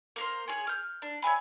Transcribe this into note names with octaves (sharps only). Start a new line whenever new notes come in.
A#3 A#4 C5
G#4 C#5 G#5
F6 G6
D4
C#5 E5 G#5 B5